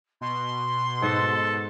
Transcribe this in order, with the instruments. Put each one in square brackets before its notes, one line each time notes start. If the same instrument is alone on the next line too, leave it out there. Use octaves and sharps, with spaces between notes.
[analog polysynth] B2 [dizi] C6
[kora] G#2 D#5 [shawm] A4